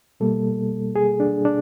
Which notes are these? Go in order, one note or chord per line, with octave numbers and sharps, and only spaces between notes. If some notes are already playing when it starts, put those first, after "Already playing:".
B2 G3 A#3 A4
G#4
D4
D4